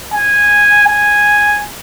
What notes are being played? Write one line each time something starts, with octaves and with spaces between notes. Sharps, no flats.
G#5
G#5